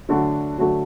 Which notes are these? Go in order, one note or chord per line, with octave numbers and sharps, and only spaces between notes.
D3 F#3 A3 D4 F#4
D3 F#3 A3 D4 F#4